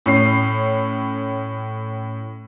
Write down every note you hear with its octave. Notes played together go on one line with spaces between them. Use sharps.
A2 C#4 C7